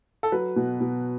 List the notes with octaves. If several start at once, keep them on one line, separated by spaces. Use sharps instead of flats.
A4
F#3 B4
B2
B2